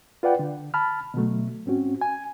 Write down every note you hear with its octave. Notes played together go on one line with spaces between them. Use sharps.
F4 B4 D5 F#5 G5
D3
A5 B5 F6
B2 D3 F#3 A3
G#2 C4 C#4 F#4
G#5